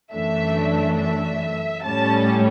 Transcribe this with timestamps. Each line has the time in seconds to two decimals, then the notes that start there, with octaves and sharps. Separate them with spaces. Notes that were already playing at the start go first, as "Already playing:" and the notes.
0.13 F#2 E3 A3 D4 E5
0.98 E5
1.84 A2 G3 C#4 A5